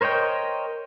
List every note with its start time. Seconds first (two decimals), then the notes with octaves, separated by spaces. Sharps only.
0.01 A#4 C5 C#5 D#5 G5